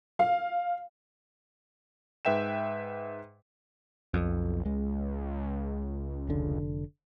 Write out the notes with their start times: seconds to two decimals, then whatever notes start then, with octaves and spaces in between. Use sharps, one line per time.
0.19 F5
2.25 G#2 B4 E5 G5 E7
4.14 B1 F2
4.65 C#2 G#3
6.29 F1 D3